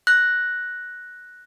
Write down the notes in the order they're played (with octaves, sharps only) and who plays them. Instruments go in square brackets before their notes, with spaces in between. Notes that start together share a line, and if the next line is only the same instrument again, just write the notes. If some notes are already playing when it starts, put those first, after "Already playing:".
[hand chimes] F#6 A#6